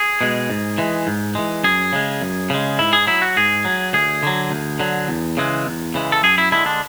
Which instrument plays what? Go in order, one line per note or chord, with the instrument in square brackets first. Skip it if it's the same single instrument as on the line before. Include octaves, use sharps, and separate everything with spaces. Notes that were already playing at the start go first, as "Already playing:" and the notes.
Already playing: [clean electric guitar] G#4
B2 G#3
G#2
E3 G#3
G#2
E3 G#3
F#2 G#4
C#3 G#3
F#2
C#3 G#3
G#2 E4
G#4
F#3 E4
F#4
G#2 G#4
F#3
D2 G#4
D3 F#3
D2
D3 F#3
E2
C#3 E3 G#3
E2
C#3 E3 G#3
A4
F#2 G#4
E4
D3 G#3 E4
D4